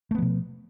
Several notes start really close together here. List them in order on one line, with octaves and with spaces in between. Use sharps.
A3 B3 F3 B2